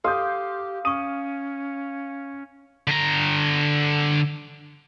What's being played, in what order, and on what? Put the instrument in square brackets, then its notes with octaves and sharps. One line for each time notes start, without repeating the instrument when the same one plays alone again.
[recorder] G4 [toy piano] A4 [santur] F5 [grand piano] C6 D#6 G6
[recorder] C#4 [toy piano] C#6 D#6 [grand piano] D#7
[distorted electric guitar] D3 A#5